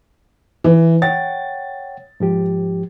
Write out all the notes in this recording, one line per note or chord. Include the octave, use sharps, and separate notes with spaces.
E3
C#5 F#5 G5 A6
G#2 F3 G4